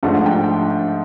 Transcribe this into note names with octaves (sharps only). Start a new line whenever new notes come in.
G#2 F3 A3 D4 F#5
G5